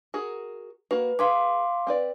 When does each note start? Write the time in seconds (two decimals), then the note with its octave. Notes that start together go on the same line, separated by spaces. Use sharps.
0.14 F#4 G#4 A#4
0.91 A#3 F#4 B4
1.19 G#4 B4 F5 C6 D6
1.87 C4 B4 D5